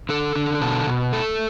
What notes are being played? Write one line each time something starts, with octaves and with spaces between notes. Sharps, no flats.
D3 A4
D3
B2 A4
B2
A3 A4